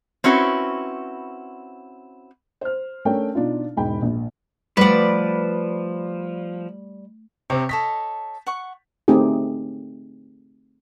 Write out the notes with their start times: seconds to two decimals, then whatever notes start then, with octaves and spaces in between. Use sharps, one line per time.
0.24 C4 C#4 E4 F#4 B4
2.61 C5 F6
3.05 A3 C#4 D4 A#4 C#5 G5
3.35 B2 D4 D#4 F4
3.77 E1 G#2 G5 B5
4.02 A#1
4.77 F3 G3 A3 B4 D5 F#5
7.50 C3 C4 C#5
7.69 A4 C#5 D#5 B6
8.47 F#5 C#6
9.08 A3 C4 D#4 G4 G#4